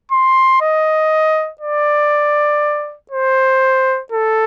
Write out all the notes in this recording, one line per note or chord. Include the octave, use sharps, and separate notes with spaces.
C6
D#5
D5
C5
A4